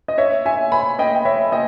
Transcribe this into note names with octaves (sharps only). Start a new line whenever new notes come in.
D#5
C#5 E5
E5 G#5
G#5 B5
D#5 G5
G5
C#5 E5
D#5 G5